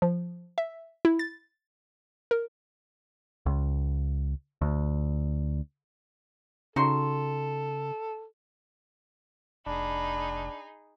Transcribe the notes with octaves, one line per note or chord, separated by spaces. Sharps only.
F3
E5
E4
A6
A#4
C#2
D2
C#3 D#4 F#4 A4 C6
F1 D4 D#4 G#4 B5